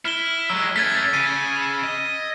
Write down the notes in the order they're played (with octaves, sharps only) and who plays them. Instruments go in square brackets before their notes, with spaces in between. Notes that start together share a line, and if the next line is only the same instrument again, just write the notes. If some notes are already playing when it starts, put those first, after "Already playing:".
[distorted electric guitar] E4 [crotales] F6 G7
[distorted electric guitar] F#3 G#3 [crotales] E6
[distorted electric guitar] A3 C#4 [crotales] G#6 A6 B6
[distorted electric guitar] C#3 [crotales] D#7
[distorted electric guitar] D#5